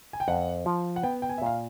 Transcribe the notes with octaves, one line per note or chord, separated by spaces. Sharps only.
G#5
G5
F2 F#5
F3
F#5
B3 G5
G5
G#5
E5
A#2 F5